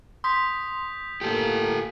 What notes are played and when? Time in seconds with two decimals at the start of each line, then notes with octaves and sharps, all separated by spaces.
0.24 C6 D#6 G6 B6
1.21 A2 A#3 G4 A4